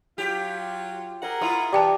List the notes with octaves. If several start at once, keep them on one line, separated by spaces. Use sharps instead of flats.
F#3 F4 G4
G#4 A#4 F#5 A#5
E4 F4 D#6
E3 G4 D5 G5 A5